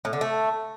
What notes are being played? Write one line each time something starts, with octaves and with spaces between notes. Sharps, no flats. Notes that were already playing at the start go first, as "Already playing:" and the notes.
A2
D3
A3